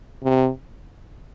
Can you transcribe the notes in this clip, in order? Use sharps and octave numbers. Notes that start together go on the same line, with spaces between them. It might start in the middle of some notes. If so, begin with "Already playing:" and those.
C3